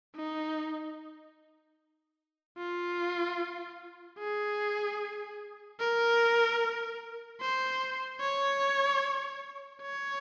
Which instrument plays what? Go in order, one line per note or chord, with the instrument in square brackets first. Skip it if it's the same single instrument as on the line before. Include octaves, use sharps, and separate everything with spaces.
[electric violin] D#4
F4
G#4
A#4
C5
C#5
C#5